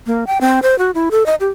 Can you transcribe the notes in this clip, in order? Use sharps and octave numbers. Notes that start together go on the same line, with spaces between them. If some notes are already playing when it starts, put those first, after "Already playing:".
A#3
G5
C4
C5
F#4
E4
A4
D#5
G4